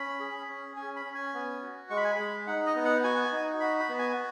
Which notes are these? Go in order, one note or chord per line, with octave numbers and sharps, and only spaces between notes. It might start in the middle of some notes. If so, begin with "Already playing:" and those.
Already playing: C#4 B5
G#4
C#4
C#4 G#5
B5
C#4
G#5
B3
F#4
G#3 C#6
B5
G#5
B5
G#3
D#4 F#5
D#5
B3
F#5
F#4 G#5
D#4
F#4 B5
B5
B3
G#5